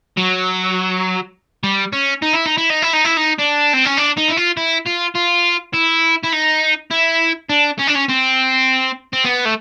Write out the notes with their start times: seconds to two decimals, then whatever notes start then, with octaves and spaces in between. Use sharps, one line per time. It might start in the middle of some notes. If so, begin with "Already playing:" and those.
0.17 F#3
1.64 G3
1.93 C#4
2.22 D#4
2.34 E4
2.46 D#4
2.58 E4
2.70 D#4
2.82 E4
2.93 D#4
3.05 E4
3.17 D#4
3.39 D4
3.74 C4
3.86 C#4
3.98 D4
4.18 D#4
4.29 E4
4.37 F4
4.57 E4
4.86 F4
5.15 F4
5.74 E4
6.23 E4
6.32 D#4
6.91 E4
7.49 D4
7.79 C#4
7.87 D4
7.95 C#4
8.08 C4
9.13 C4
9.25 B3
9.45 A3